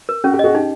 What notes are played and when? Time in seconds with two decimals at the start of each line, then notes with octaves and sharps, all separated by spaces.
0.09 A#4
0.24 C#4 F#4
0.34 G4
0.39 F#4 G#4 D#5
0.55 D#4 G4